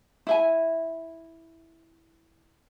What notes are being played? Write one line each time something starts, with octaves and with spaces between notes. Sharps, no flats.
E4 E5 G#5